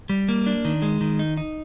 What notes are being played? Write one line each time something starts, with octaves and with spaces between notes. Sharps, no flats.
G3
A#3
D4
D#3
G#3
D#3
D#4
D#4